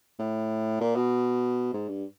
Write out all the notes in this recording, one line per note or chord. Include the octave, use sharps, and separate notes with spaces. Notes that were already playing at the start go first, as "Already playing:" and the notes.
A2
A#2
B2
G#2
G2